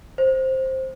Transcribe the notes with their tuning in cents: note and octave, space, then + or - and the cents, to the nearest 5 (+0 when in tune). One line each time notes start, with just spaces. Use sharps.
C5 +10